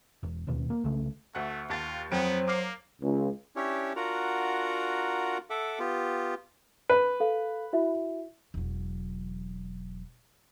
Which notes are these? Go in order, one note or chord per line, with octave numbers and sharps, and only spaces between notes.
E1
D1 D#2 B2
A#3
C2 C#3 A3
D2 A3 F#5 F#6
D#2 F4 A5 A6
F2 F#3 B3 C5 G5 D7
A#3 D6 F6 C7
C#2
C#4 D4 E4 G4 C#5
D4 F4 F#4 A#4 F#5 A#5
A4 E5 F#5 D6
B3 F4 G4
B4
A4 F5
E4 F#4 E5
E1 F#3